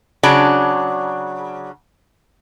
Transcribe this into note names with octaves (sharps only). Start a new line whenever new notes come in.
C#3 F#3 D4